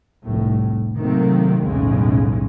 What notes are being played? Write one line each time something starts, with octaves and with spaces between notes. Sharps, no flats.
F1 C2 A2
C3 D#3 F#3 A3 A#3 C4
B1 E2 A2 C#3 G#3